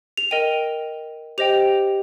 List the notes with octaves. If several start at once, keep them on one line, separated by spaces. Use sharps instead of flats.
F7
A#4 D#5 G5 D#7
G4 C5 D#5 G5 F7